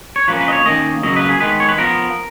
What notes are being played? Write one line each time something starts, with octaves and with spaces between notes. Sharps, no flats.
C#5
F3 A#3 C#4 B4
B4
D#5
C#5
D#3 A#3 C#4 D#5
C#3 F#3 A#3 D#5
B4
G#4
D#3 G#3 B3 B4
C#5
B4
F3 B3 A#4